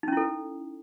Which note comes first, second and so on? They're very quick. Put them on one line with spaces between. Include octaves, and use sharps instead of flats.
D#4 C#4 E4 A4